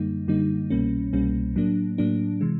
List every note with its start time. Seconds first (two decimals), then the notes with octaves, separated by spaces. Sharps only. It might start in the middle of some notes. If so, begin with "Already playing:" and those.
Already playing: F#2 D3 G3 A#3 D#4
0.28 F#2 D3 G3 A#3 D#4
0.70 C2 B2 G3 A#3 C#4
1.13 C2 B2 G3 A#3 C#4
1.56 A2 F#3 A#3 D4
1.98 A2 F#3 A#3 D4
2.41 C3 E3 G#3